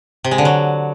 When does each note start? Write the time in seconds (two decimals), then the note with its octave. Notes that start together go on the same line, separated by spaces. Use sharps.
0.24 C3
0.31 G#3
0.38 D3
0.45 F#3